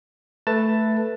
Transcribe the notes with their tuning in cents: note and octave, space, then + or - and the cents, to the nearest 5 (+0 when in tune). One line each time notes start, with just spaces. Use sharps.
A3 +0 B4 +0 A5 +10